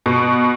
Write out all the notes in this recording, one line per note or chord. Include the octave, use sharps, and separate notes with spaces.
B2